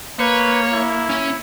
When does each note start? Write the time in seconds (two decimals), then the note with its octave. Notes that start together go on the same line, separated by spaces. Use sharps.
0.19 A#3 B4 C#5
0.73 E4
1.10 C#4